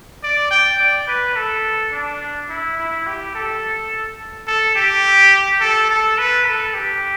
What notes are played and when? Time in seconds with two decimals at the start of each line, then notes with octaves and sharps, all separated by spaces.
0.23 D5
0.51 G5
0.80 D5
1.08 B4
1.36 A4
1.93 D4
2.49 E4
2.78 E4
3.07 G4
3.35 A4
4.47 A4
4.75 G4
5.61 A4
5.90 A4
6.18 B4
6.46 A4
6.74 G4